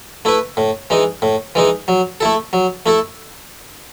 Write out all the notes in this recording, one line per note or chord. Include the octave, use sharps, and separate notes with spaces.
A3 E4 B4
A2
E3 G#3 D#4
A2
E3 G#3 D#4
F#3
A3 E4 A4
F#3
A3 E4 A4